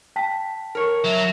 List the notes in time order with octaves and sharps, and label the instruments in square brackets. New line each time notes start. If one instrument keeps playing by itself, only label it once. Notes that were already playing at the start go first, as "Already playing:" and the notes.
[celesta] G5 A5 B6
[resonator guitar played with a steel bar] A#4 C#5
[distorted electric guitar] F#3 [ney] E5